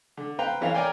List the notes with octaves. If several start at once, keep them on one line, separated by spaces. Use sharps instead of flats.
D3
B4 C5 F5 G5 A#5
F2 E3 C#5 F5
A#4 C#5 D5 G5 G#5